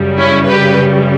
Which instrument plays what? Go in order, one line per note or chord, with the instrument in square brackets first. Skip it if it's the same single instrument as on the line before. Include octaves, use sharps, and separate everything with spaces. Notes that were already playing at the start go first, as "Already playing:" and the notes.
Already playing: [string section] F#2 C#3 G3
C#4 E4
G4 B4